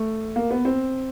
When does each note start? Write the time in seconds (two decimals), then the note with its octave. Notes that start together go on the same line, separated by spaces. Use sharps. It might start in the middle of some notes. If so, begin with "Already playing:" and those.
Already playing: A3
0.36 A#3
0.51 B3
0.65 C4